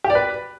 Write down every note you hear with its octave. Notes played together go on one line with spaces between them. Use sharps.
G4
D5
B4